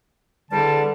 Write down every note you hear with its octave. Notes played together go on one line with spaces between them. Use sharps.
E2 D3 G3 A5